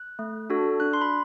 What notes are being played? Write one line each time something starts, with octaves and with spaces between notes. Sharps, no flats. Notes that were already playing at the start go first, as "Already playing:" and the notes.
Already playing: F#6
A3
D4 F#4 A4
D4 F#6
C6
B5